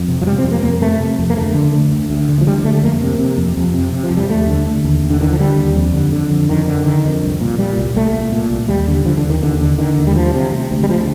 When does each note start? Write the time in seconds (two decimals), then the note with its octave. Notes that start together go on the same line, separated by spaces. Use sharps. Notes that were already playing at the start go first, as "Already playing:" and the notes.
Already playing: F2
0.08 C3
0.22 F3
0.26 C3 G3
0.38 C4
0.44 F2
0.51 A#3
0.63 F2 A#3
0.81 C3 A3
1.00 C3
1.19 F2
1.30 A#3
1.36 D2 A3
1.54 D3
1.73 D3
1.91 D2
2.10 D2
2.29 D3
2.41 F3
2.47 D3 G3
2.64 D2 A3
2.82 F2 A#3
3.01 C3
3.19 C3
3.38 F2
3.57 F2
3.74 C3
3.93 C3
4.04 F3
4.11 F2
4.17 G3
4.29 D#2 A3
4.47 D3
4.67 D3
4.84 D#2
5.03 D#2
5.10 D3
5.21 D3 D#3
5.30 F3
5.39 D3 G3
5.58 D#2
5.76 F2
5.94 D3
6.12 D3
6.31 F2
6.49 F2 D#3
6.67 D3
6.86 D3 D#3
7.05 F2
7.23 C2
7.41 A#2
7.58 A#2 G3
7.78 C2
7.96 C2 A3
8.13 A#2
8.32 A#2
8.50 C2
8.68 D#2 G3
8.88 D3
9.05 D3 F3
9.17 D3
9.23 D#2
9.30 D#3
9.42 D#2 D3
9.61 D3
9.78 D3 D#3
9.98 D#2
10.07 G3
10.15 D2 F3
10.34 C3
10.52 C3
10.71 D2
10.83 G3
10.89 D2 F3